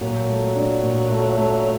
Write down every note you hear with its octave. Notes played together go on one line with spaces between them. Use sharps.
A#2 F#3
A3
D4
A#2
A3
A3